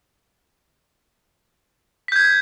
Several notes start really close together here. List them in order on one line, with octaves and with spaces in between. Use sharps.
B6 G6 G#6